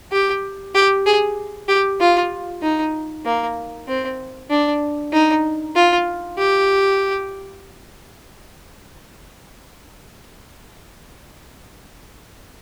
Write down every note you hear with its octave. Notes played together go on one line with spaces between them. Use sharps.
G4
G4
G#4
G4
F4
D#4
A#3
C4
D4
D#4
F4
G4